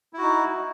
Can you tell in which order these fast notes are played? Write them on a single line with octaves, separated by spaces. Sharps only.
E4 F#4 D#4